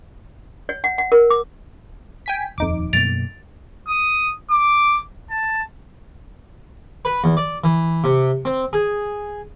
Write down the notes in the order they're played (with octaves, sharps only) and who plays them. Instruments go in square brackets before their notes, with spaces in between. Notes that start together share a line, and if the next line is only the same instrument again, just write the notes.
[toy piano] C#5
F#5
F#5
A#4
D6
[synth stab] G5 G#5 B6
[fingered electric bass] D#1 [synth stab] F2 D#4 D6
[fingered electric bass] F#2 B2 A#3 [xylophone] A6 D7 F7
[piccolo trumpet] D#6
D6
A5
[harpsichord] B4
E2
D5
E3
C3
C4
G#4